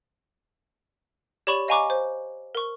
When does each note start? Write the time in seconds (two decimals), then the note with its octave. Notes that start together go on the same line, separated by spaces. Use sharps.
1.47 G4 C#5 D5 B5 C#6 E7
1.68 D#5 F5 G#5 A#5 C#6 D6
1.90 C5
2.55 A#4 C#6